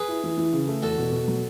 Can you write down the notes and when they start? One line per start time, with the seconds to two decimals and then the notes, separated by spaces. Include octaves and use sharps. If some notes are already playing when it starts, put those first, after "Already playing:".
Already playing: G#4 B4
0.08 E4
0.23 E3
0.37 E3
0.53 C#3
0.67 A3
0.82 E2 F#4 A4
0.98 B2
1.12 B2
1.28 F#3